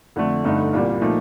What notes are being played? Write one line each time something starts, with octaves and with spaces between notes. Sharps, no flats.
F2 D3 A3
G1 G2 D3 A3 D#4
C2 A#2 G3
A#2 F3 A3 D#4